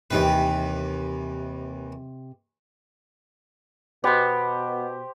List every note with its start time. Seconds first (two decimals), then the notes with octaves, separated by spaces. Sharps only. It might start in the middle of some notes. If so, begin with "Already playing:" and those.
0.11 D#2 C3 E3 D#4 G4 B4
4.04 B2 B3 G4 C5